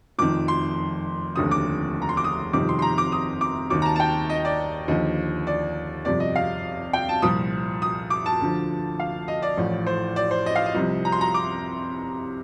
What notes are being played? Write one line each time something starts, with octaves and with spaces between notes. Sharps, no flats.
F1 F2 D#3 D6
C6
F1 D#2 D3 D#6
D6
A#5
C6
D6
D#6
G1 F2 C3 D#3 D6
C6
C6
A#5
D6
D#6
D6
D#2 D#3 D6
A#5
A5
A5
G5
D#5
D5
D#2 D3 F3 D#5
D5
G1 F2 C3 D5
D#5
F5
G5
A5
C2 A#2 F3 D#6
D#6
D6
A5
D2 D3 F3
F5
D#5
D5
A1 A2 F3
C5
D5
C5
D#5
F5
D#5
C2 C3 F3
A#5
C6
A#5
D6